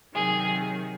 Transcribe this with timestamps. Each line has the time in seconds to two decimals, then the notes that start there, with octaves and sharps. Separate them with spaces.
0.13 C3 D#3 F#3 G#4